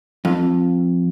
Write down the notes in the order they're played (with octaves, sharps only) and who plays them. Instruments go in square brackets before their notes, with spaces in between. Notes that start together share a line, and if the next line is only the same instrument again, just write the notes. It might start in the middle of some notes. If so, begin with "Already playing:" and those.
[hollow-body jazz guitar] F2